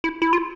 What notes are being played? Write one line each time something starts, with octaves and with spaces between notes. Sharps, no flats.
E4
E4
F4